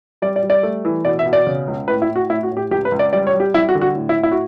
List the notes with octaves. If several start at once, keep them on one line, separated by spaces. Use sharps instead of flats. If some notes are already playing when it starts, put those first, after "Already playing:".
G3 D5
D5
G3
D5
A3
E3
B2 D5
E5
B2
D5
C#3
C#2
A2 B4
E4
A2
F#4
A2 E4
F#4
A2
G4
C#2 G4
B4
C#2
D5
G3 D5
C#5
G3
G4
G3 E4
F#4
D3
F#4
A2
E4
A2
E4
F#4